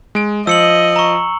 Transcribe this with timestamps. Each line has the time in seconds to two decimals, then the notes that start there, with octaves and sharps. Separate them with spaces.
0.15 G#3 D7
0.47 F3 D#5 E6 C#7 F#7
0.96 A#5 C#6